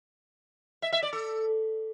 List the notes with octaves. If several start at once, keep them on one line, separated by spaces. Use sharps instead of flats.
E5
E5
D5
A4